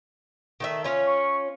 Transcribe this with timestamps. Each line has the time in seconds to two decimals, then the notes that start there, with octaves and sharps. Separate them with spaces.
0.60 D#3 A3 E5
0.84 C#4 F4 C#5
1.07 C#6